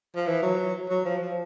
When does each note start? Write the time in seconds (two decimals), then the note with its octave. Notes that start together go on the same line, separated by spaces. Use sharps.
0.16 F3
0.27 E3
0.42 F#3
0.90 F#3
1.05 F3
1.21 F3